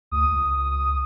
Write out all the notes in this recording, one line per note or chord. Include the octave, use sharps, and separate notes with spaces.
D2 D#6
C#2